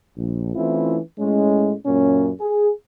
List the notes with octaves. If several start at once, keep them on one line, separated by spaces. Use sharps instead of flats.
A#1
E3 A3 C4 C#4 E4 F4
A2 G#3 C#4
F#2 A#2 A#3 C#4
G#4